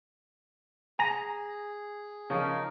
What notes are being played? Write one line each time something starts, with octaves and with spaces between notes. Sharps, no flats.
G#4 G#5 A#5 A#6
C#3 F3 C#4 D#4 A#4